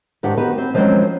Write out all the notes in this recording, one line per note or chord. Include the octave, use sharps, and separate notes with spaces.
G#2 D#3 D4 G4 F#5
D#3 B3 F#4 G4 B4
C4
D#3 F3 F#3 G#3 C4 C#4